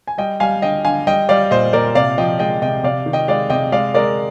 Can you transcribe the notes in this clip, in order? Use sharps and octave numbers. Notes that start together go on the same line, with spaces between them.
G#5
G3 D#5 G5
G3 F5 G#5
D3 D#5 G5
D3 F5 G#5
G3 D#5 G5
G3 D5 F5
A#2 C5 D#5
A#2 A#4 D5
C3 D5 F5
F3 D#5 G5
G#3 D#5 G5
C3 D#5 G5
C3 D5 F5
D#3
D#5 G5
G#3 D5 F5
C3 D#5 G5
G#3 D5 F5
G#3 A#4 D5